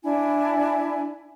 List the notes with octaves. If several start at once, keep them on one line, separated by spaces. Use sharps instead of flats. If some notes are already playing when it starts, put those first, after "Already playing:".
D4 E4 G#5